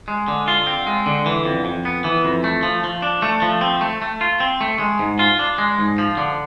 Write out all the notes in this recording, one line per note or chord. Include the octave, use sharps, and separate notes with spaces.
G#3
D3
F4
C4
G#3
D3
E3
F2
F2
B3
E3
F2
A3
F3
F3
D4
A3
F3
C4
A3
A3
F4
C4
A3
G#3
G#2
F4
D4
G#3
G#2
F3
D3